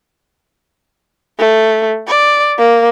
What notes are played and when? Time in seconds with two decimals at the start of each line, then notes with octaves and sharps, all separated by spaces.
1.39 A3
2.07 D5
2.58 A#3